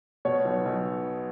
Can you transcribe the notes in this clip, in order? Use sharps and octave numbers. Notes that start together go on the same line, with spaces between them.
B2 C#5
B1
B1